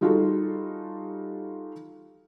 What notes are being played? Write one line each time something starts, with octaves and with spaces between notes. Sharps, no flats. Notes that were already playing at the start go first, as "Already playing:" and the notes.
G3 D#4 F4 F#4 G#4 A4